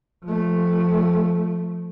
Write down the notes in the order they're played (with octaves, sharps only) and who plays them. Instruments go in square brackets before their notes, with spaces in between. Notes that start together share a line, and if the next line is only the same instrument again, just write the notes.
[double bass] F3 A3